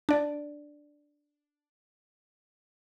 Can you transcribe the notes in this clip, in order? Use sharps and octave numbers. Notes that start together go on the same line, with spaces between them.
D4 D5